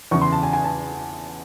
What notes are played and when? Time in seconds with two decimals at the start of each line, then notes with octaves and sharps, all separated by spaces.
0.11 E2 C#3 E3 C#6
0.21 C6
0.32 A5
0.43 G#5
0.53 G#5
0.65 A5